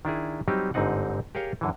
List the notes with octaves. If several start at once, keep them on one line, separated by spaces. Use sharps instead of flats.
D#3 D4 E4 G#4
F#3 G3 C4 D#4 G4
G1 G#2 D3 C4 D#4 F#5
G4 G#4 A#4 C#5 F5 G5
F#2 D3 E3